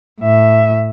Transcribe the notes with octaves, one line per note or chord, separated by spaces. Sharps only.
A2 E5